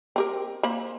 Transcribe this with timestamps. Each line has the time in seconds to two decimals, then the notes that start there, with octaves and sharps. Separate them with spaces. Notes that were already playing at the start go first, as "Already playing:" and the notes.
0.16 C4 G4 A#4
0.63 A#3 C5 B5